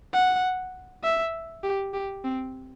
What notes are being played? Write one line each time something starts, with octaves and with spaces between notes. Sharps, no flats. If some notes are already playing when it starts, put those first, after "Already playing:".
F#5
E5
G4
G4
C4